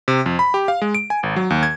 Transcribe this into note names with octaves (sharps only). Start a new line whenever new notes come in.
C3
F2
B5
G4
F5
G#3
D7
G#5
G#1
F#3
D#2
G#6